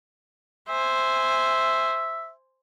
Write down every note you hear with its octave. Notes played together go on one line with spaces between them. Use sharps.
C5 E5 G#5